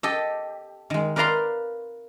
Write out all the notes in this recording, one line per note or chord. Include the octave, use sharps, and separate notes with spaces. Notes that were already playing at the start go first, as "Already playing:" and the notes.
G4 A4 D#5
D#3 G#3
A#4 B4 D5 F5 A#5 C6